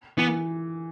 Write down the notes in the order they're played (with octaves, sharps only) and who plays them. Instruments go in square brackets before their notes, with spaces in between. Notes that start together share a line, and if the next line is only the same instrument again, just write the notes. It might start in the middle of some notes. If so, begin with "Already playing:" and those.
[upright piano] E3 [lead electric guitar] B3